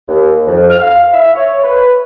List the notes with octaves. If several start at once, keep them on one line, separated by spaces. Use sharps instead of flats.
D#2
F2
F6
F5
E5
C#5
B4